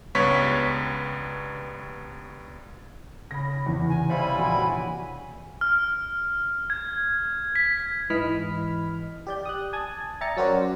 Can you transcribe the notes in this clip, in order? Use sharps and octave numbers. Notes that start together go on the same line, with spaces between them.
C#2 G2 B3 C#5 B6
C#3 B5 A#6
E2 C3 E3
G#5
G3 E4 C5 C#5 F5 B5 C6 A6
A#1 E3 F#4 G#4
F6
G#6
B6
G#2 E3 D#5 B5 F6 B6
G4 D5 G6
D#6 F#6
G#5 A5 D#6 G#6
D5 E5 G5 A#5 A6 C#7
F#3 C#4 F#4 A#4 C5 D5